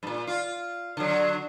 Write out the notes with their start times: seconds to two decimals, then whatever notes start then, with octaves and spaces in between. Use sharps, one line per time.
0.03 G2 A#2
0.27 F4
0.97 D3 F#3